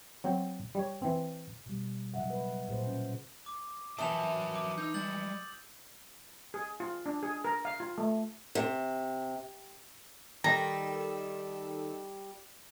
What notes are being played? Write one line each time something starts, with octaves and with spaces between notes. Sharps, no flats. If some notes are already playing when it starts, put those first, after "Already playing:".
F#3 C4 C5
G3 C#5
E3 C4
B2 G3
C#3 F#3 D#5 E5 F#5
B4
G3
A#2 G#4 C5
C#4
D6
E3 F#3 A#4 E5 A5 D#6 F7
D6
D#4 E6 G6
G3 G#3 G6 A6 F#7
G#4
F4
D4
G#4
A#4
F5
F4
A3
C3
D#3 G3 A4 A#5 E6